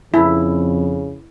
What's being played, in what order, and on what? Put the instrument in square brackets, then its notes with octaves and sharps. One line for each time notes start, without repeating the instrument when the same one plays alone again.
[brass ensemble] F2 [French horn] C#3 [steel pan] E4